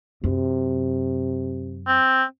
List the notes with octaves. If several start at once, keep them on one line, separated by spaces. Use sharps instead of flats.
F#2 C3
C4